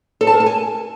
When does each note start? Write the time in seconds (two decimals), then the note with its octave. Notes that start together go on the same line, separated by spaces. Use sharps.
0.21 A4
0.27 A5
0.34 A#4
0.40 A5
0.46 G#5